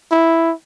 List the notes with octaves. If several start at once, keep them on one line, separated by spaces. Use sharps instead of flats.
E4